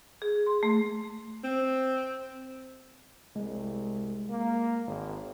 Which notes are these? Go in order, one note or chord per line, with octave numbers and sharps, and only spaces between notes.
G#4
C6
A3
C4
C2 G#3
A#3
G#1